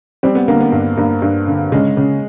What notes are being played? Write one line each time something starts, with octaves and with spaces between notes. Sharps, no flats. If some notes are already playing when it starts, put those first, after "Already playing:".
G3 C4
B3
D3 A#3
B3
G2
G2 A#3
G2
D3
C#3 G#3
C#3